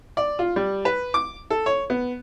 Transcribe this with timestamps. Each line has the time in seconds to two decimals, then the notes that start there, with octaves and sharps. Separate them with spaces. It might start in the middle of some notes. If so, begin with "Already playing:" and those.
0.17 D5
0.39 F4
0.56 G3
0.85 B4
1.14 D6
1.50 A4
1.66 C#5
1.90 B3